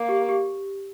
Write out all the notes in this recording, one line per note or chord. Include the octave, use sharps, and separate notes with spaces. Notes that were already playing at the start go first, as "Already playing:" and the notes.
Already playing: A#3
G4
G4